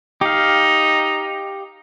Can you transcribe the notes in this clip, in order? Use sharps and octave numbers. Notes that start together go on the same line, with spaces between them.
D#4 G4 F5